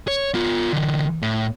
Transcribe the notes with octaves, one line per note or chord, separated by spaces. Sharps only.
C#5
B3 F4
D3 E3
A2